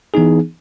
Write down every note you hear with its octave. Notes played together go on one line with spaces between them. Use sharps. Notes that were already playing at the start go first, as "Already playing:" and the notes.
E3 B3 D#4 G#4